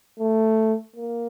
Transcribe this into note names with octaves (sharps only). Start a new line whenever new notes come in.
A3
A#3